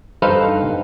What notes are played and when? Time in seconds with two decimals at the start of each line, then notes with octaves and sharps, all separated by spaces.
0.22 G2 D#4 A4 B4 C5 F5